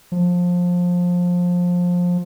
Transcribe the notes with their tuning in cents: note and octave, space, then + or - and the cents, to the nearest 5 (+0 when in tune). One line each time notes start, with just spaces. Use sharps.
F3 +20